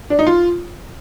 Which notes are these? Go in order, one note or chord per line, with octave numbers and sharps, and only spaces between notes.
D4
D#4
F4